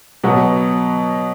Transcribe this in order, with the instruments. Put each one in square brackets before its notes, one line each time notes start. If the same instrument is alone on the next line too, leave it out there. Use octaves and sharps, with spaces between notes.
[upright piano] B2 F#3 B3